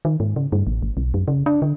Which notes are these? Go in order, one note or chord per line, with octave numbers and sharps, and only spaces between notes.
D#3
G#2
C#3
G2
A1
G#1
B1
F#2
C#3
D4
D3